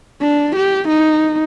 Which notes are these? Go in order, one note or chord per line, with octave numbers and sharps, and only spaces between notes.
D4
G4
D#4